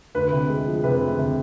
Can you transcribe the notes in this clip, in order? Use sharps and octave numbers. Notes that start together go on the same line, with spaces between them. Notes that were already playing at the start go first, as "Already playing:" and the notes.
D2 B4
C3
G#3
F3
C3 B4
D2
C3